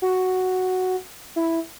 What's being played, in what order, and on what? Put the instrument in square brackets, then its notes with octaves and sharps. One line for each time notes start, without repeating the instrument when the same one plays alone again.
[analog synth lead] F#4
E4